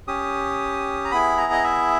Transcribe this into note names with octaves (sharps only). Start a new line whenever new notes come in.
C#4 G4 D#6
A#5
B3 E4 G#4 B5
A#5
D#5
E5